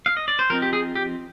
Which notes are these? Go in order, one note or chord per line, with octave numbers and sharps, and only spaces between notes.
F5
D#5
D5
C5
F3 C4 D#4 A#4
G4
G#4
G4